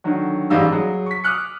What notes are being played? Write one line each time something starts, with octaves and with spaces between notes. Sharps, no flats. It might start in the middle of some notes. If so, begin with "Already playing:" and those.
D3 D#3 F#3 C#5
A1 G#2 G3 D#4 F5 E6
F#3 G#4
C#6 B6
D6 D#6 F6 F#6 C#7